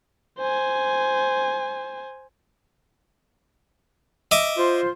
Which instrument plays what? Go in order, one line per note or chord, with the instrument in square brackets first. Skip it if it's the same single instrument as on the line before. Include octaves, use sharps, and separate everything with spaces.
[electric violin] C5 G#5
[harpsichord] D#5 E5 D6
[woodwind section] F4 C5